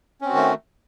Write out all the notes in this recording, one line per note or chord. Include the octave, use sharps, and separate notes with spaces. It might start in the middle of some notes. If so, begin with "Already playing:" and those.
D#3 A3 C4 C#4 F#4